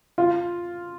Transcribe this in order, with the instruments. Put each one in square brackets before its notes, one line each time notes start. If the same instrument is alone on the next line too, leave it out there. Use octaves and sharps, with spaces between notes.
[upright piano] F4